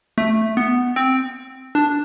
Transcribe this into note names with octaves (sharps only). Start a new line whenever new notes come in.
A3
B3
C4
D4